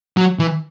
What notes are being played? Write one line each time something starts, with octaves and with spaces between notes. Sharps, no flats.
F#3
E3